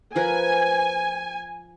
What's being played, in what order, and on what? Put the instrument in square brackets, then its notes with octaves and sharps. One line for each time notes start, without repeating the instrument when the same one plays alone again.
[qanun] F3 A#4 B4 [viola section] G#5